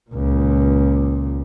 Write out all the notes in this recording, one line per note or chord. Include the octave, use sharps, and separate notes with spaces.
C#2 A#2